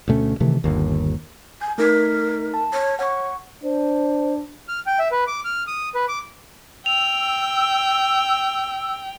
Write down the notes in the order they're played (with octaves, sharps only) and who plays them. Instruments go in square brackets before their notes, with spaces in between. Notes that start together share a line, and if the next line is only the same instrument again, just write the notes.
[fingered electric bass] D2 B2 A3 C#4
C3 D#3 E3 A3
G1 D#2
[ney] G#5 [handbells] G6
[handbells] A3 D#4 B6 [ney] A#4
[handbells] A5
[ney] C#5
[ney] C#5 [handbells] F#5 C#6
[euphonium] D4 [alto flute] C5
[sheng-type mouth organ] F6
G5
E5
B4
D6
F6
D#6
B4
D6
[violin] G5 [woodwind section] E6 [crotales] F7